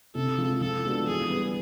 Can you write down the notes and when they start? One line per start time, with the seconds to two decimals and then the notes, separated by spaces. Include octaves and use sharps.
0.15 C3 A4
0.38 F3 G#3 C4
0.61 F3 A4
0.84 G#3 B3 D4 F#4
1.07 E3 G#4
1.30 G3 B3